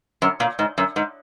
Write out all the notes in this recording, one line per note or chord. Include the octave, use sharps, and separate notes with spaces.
F#2
A#2
G#2
F#2
G#2